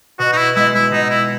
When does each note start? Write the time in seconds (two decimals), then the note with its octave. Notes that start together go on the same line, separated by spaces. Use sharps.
0.19 B2 F#4
0.33 D#4
0.37 E4
0.56 G#3 B3 E4
0.74 E4
0.92 B2 D#4
1.11 E4